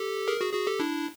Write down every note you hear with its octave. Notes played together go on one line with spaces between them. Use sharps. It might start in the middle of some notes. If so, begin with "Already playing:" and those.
Already playing: G4 A4
G#4 A#4
F#4 G#4
F#4 G#4
G4 A4
D4 E4